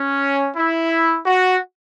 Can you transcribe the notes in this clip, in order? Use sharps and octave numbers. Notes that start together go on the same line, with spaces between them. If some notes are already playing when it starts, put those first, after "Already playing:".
Already playing: C#4
E4
F#4